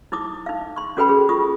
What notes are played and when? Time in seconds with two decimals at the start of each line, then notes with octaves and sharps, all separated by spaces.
0.12 D#4 E4 D6 D#6
0.46 D#4 F5
0.76 C6 C#6
0.97 C#4 F#4 A4 B4 G5 B5
1.09 G#4
1.29 F4 C#6 D#6